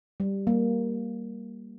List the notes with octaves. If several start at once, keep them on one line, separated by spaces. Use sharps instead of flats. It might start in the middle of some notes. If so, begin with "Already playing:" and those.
G3
G3 A#3